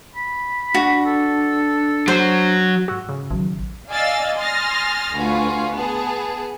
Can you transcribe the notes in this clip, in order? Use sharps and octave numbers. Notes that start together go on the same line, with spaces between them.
B5
D4 F#4
A4
F#3 C5
G#2 F#4 E6
C#3
A1 D#3 F#3
D5 D#5 F5 G#5 E6 A6
G#5 C6 D#6 F6 A6 A#6
D2 F4 F#4 B4 G#5
B3 G#4 A5